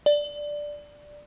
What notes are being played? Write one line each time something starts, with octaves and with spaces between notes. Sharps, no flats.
D5